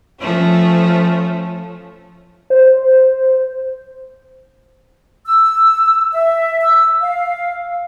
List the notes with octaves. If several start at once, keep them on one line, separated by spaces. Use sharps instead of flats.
F3 A3 C#4
C5
E6
E5
E6
F5